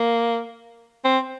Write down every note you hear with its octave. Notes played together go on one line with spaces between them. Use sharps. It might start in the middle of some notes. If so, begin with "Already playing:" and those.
Already playing: A#3
C4